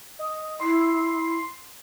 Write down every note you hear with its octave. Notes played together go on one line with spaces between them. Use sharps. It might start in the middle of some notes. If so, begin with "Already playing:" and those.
D#5
E4 C6